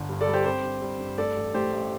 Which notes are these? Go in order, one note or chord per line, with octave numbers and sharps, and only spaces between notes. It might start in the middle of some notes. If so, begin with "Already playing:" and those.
Already playing: G1 D3
G2
A4 D5
G3
G4 C5
C4 G4 C5
G2
G3
G2
A3 A4 D5
A1
A2 G4 C5
A1